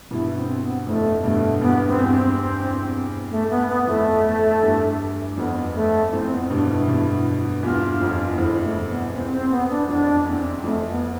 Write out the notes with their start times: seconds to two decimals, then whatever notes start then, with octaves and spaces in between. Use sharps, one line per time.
0.11 G2 B2 E4
0.36 C4
0.61 B3
0.86 F2 A2 A3
1.23 G2 B2 A3
1.61 E2 G2 B3
1.87 C4
1.99 E2 G2
2.12 C4
3.31 A3
3.50 B3
3.68 B3
3.87 F2 A2 A3
4.62 E2 G2
5.37 F2 B3
5.75 A3
6.12 F2 A2 C4
6.31 B3
6.50 G2 B2 D4
6.69 E4
6.88 G2 B2
7.63 E2 G2 F4
8.00 F2 F4
8.30 E2
8.38 F2 E4
8.63 A3
8.88 B3
9.13 E2 C4
9.32 C4
9.51 B3
9.70 D4
9.88 F2 D4
10.26 E2 C4
10.64 F2 A3
10.89 B3